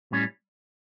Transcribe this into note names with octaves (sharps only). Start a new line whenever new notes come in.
A2 G3 C#4